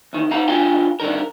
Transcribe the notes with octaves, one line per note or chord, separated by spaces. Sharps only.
E2 D#3
D#4 F5 F#5 A#5
B1 D4 F4 F5 G5 G#5
G2 D3 D#3 A#4